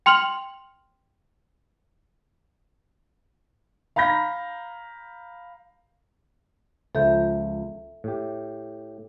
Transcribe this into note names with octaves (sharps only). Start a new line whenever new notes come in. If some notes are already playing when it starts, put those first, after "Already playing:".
G5 C6 F6 F7 F#7
F5 A#5 B5 G6 A#6
C#2 F3 A4 E5 G6
A2 G4